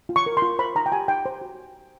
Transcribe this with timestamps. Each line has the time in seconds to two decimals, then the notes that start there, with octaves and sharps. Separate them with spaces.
0.09 F4
0.16 C#6
0.26 A#4
0.37 C6
0.42 F4
0.59 C5 B5
0.75 D#4 A#5
0.86 G5
0.92 G4 G#5
1.08 D#4 G5
1.26 C5
1.41 F#4